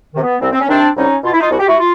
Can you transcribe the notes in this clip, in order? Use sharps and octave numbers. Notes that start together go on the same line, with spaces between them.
C3 D#3
B3
C2 C4
C4
C#4
C3 D#3 C4 D4
C2 C#4 D#4
B2 F4
E4
D#4 F4
C2 F#4
G4
E4 F#4
F4